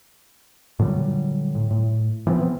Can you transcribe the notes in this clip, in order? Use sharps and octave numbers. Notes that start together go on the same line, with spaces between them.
A#2 D3 F#3 G3
A2
A2
E3 F3 B3 C4